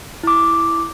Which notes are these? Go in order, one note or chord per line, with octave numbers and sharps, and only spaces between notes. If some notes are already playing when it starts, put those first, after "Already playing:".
E4 D6